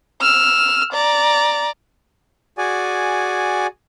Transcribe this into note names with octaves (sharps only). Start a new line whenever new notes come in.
E6 F6
D5 A#5
F#4 G#4 D5 G#5